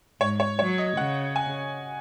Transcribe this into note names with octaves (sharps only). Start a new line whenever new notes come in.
G#2 C#5
C#5
F#3 C#5
D#5
C#3 F#5
G#5